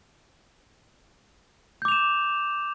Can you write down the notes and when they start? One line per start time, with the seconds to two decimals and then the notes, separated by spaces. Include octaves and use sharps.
1.82 G6
1.85 D6
1.88 F7
1.92 E7